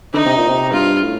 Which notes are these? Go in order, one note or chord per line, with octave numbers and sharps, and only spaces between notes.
D3 D#4
C3
A#2
C3
G2 F4
A2